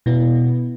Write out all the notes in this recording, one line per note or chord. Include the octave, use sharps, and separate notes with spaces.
B2 B3 E4